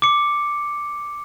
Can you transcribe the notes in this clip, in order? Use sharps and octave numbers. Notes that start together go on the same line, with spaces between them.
D6 C#7